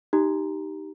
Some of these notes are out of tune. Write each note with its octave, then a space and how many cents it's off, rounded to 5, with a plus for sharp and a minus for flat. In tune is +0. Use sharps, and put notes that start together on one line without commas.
D#4 +0 G4 -5 A#5 +0